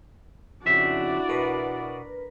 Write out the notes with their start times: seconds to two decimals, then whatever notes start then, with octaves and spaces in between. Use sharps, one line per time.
0.66 F2 C#3 D4 E4 F#4 D5 E5
1.29 B2 A#4 B4